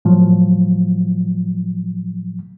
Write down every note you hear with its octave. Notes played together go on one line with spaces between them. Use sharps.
A2 F3 F#3